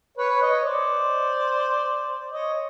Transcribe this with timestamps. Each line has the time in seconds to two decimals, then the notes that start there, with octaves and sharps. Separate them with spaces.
0.18 B4 C#5
0.42 C#5 D#5
0.65 C5 D5
2.32 C#5 D#5